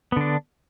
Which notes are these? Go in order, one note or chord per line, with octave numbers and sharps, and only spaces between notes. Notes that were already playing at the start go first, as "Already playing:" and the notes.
D3 B3 D4